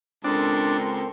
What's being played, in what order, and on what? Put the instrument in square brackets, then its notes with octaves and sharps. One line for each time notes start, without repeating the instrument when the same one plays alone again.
[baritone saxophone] C#2 [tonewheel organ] C4 [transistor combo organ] D4 [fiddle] A4 A#4